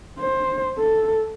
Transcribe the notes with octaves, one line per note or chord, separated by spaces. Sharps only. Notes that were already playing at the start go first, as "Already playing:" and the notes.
C5
A4